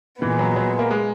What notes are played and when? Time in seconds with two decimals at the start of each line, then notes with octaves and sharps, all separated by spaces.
0.21 A#2 E3 G#3 B3
0.39 F#3
0.56 F#3
0.79 A#3
0.90 G#3